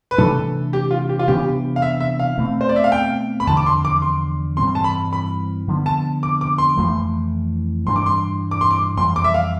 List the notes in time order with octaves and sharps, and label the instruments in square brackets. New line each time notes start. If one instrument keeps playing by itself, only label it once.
[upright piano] B4
[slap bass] C3 E3 A3 D4 [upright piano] A4
[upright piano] G4
F4
G4
F4
[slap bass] C3 E3 B3 D4 [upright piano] G4
[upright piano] F5
E5
E5
F5
[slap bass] B2 A3 C4
[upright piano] C5
D5
E5
F5
G5
B5
[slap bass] E2 D3 F3 [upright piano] A5
[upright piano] D6
C6
D6
C6
[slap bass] G2 E3 G3 C4 [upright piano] C6
[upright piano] A5
B5
B5
[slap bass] D3 F3 B3
[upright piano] A5
D6
D6
C6
[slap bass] F2 E3 A3
[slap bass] G2 E3 G3 D4 [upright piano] C6
[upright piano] D6
C6
D6
C6
D6
[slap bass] F2 E3 G3 [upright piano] C6
[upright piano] D6
E5
F5